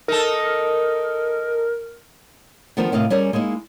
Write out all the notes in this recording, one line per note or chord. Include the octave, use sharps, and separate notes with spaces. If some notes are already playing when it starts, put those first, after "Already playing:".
D#4 A4 A#4
D#3 F3 B3 D4 A#4 C5
A2 C3 A#4 D#5 F5
G3 C#4 G#4 A#4
G#3 A#3 D#4 E4